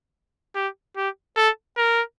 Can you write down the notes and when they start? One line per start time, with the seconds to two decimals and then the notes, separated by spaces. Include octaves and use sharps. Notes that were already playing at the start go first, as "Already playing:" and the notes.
0.55 G4
0.97 G4
1.37 A4
1.77 A#4